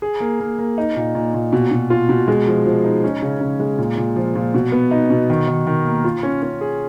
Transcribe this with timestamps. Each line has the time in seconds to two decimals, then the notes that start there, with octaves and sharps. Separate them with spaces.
0.02 G#4
0.20 A#3
0.40 A#3
0.59 A#3
0.78 D#4
0.96 A#2
1.15 A#2
1.34 A#2
1.53 B2
1.71 B2
1.90 F4
2.09 B2
2.28 G#3
2.47 F3
2.66 F3
2.84 D#4
3.04 C#4
3.22 C#3
3.41 C#3
3.60 G#3
3.78 A#2
3.97 A#2
4.16 F3
4.35 A#2
4.54 B2
4.72 B3
4.91 D#4
5.10 B2
5.30 D#3
5.48 D#3
5.67 D#3
5.85 A#3
6.04 F4
6.23 C#4
6.43 C#4
6.61 G#4